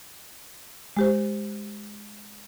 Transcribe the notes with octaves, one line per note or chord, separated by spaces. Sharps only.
G#3 G4 C5